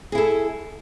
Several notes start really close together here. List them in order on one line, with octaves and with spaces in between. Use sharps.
G#4 E4 A4